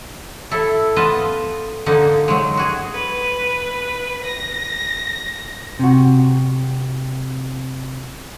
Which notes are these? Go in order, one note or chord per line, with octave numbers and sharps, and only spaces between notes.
E4 A4
B3 F4 B4 D#5 A5
D3 A#3 D#4
F#3 G#3
F#4 G#4
B4
A#6
C3 F#4